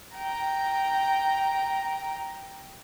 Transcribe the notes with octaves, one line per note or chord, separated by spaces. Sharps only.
G5 A#5